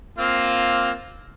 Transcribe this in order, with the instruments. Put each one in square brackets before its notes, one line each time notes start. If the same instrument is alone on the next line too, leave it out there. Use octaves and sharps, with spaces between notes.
[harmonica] A#3 C4 F4